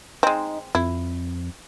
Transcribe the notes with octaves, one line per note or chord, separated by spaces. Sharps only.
G#3 C4 D#4
F2 E4